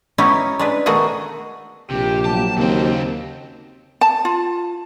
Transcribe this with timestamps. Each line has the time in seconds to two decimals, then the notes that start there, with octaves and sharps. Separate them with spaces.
0.18 B3 C#4 D#4 E4 G4 C#5
0.59 G#3 D4 B4
0.86 B2 D#3 A3 F#4 G#4 F#5
1.91 A#1 C3 G4
2.25 F#3 A#3 A5
2.58 D#2 C#3 C4 F#4
4.01 A5
4.25 F4